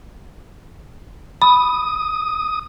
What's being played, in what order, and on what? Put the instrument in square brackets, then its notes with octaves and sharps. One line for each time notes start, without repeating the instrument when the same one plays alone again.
[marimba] B5 [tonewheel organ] D#6